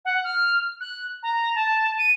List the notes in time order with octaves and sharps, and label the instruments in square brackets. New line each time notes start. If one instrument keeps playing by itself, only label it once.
[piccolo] F#5
F6
F#6
A#5
A5
D#7